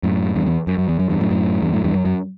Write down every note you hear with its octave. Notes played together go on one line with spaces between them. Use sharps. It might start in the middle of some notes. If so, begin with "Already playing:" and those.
F#2 A2
E2 G2
E2
F#2
F#2
E2
F#2
E2 G2
F#2 A2
F#2 A2
E2 G2
F#2 A2
E2 G2
F#2
F#2